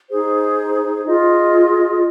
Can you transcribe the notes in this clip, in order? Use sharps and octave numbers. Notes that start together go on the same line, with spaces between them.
D#4 G#4 C5
F4 G#4 D#5